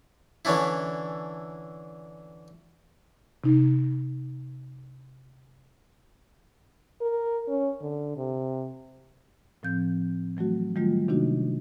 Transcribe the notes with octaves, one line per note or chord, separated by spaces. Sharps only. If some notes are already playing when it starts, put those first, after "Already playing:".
D3 E3 C#4 D4 E4
C3 D#4
A#4
C#4
D3
C3
A2 F3 C4 G6
E3 F#3 A3 F#4
D#3 F#3 G3 A3 F4
C3 D#3 A#3 D4 D#4 F#4